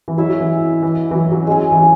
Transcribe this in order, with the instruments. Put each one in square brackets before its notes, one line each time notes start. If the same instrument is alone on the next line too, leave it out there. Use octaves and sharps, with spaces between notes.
[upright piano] E3
[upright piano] F#3 [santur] G#3 E4 C#5 E5
[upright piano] F#3
E3
E3
E3
F#3
F#3
[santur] G#3 C#4 G#4
[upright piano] E3
F#3